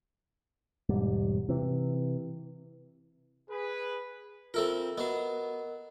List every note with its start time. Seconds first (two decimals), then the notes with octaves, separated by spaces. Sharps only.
0.89 E1 G#2 G3
1.49 C3 E3
3.50 G#4 B4
4.54 C4 F4 A4 A#4 E5
4.98 B3 F#4 A#4 D#5